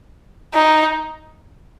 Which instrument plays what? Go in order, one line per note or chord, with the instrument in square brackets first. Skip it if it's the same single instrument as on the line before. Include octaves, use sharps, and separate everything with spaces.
[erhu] D#4